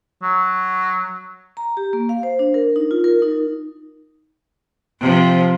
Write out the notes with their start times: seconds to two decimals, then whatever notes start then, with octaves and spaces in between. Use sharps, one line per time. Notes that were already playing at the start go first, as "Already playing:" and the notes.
0.23 F#3
1.57 A#5
1.77 G4
1.93 A#3
2.09 F5
2.23 C5
2.39 D4
2.54 A#4
2.76 D#4
2.91 F4
3.04 A#4
3.22 D#4
5.00 C3 F3